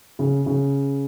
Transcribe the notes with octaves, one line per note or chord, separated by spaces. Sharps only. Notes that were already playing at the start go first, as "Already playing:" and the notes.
C#3
C#3